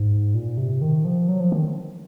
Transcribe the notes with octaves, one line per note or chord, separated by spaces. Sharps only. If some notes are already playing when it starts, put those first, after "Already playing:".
Already playing: G#2
A#2
C3
D#3
F3
F#3
F3
D#3